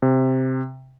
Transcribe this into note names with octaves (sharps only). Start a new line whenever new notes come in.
C3